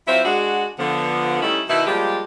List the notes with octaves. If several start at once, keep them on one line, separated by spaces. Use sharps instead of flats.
F#3 C4 E4 F4 C5 E5
G#3 D4 F#4
D3 F3 B3
G3 A3 C#4 D#4 E4
B2 D#3 D#4 E4
F3 G3 G#3 A#3 G4